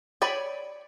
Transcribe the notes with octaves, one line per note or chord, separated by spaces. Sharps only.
C#5 D5 G5 G#5 B5